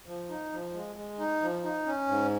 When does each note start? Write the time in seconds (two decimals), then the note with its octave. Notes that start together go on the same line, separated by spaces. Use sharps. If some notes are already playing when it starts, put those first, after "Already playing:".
0.06 F3
0.29 D#4
0.52 F3
0.73 G#3
0.96 G#3
1.19 D#4
1.41 F3
1.63 D#4
1.86 C#4
2.08 G#2